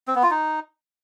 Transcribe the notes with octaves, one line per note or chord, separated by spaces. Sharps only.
C4
B3
F4
D#4